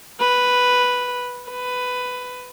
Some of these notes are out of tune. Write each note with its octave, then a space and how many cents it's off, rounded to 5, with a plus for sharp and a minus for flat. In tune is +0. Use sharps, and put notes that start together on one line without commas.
B4 +0
B4 +10